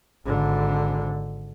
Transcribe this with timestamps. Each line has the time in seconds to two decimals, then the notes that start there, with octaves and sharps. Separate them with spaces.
0.24 G#1 D3